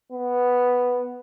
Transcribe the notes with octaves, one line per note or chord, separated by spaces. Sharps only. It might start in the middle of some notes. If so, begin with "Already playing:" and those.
B3